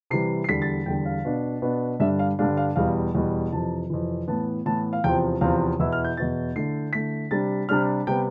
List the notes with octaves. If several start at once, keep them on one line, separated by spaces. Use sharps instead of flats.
C3 E3 G3 C7
C7
E2 D3 G3 B6
A6
E2 D3 G3 G5
F5
B2 B3 D4
B2 B3 D4
G2 D3 G3 D4 E5
F5
G2 D3 G3 D4 F5
F5
E2 B2 G3 F5
E2 B2 G3
F2 C3 E3 A5
F2 C3 E3
A2 E3 B3 A5
A2 E3 B3 A5
F5
E2 C3 F3 C4 G5
E2 C3 F3 C4 F5
E2 B2 B3 E4 E6
F6
G6
E2 B2 B3 E4 A6
D3 A3 E4 C7
D3 A3 E4 B6
C3 G3 D4 A6
C3 G3 D4 F6
C3 G3 B3 G5